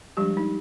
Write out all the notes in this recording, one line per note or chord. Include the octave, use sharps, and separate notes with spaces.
F3 G3 G#3 D4 G4
D#4